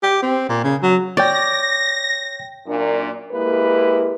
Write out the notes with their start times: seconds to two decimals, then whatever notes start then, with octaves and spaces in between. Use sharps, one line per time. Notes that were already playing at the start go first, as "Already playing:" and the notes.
0.03 G4
0.22 C4
0.49 A#2
0.64 C#3
0.83 F#3
1.17 C#5 D5 G5 A#6
2.66 F#2 A#2 A#3 D4
3.32 G#3 A#3 E4 G4 B4